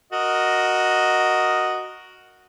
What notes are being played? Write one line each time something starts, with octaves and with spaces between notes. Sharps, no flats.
F#4 A#4 D#5